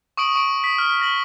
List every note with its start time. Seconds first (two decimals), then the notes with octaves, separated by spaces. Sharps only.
0.17 C#6 D#6 D7 F#7
0.35 C#6 D7
0.64 B6
0.78 F6
1.01 A#6 F#7